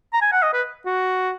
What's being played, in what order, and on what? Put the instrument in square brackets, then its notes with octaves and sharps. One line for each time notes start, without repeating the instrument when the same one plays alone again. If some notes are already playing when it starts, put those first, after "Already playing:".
[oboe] A#5
G#5
F#5
D#5
B4
F#4